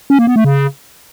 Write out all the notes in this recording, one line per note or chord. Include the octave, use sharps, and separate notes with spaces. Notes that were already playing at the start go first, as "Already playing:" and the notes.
C#4
A#3
B3
A3
C#3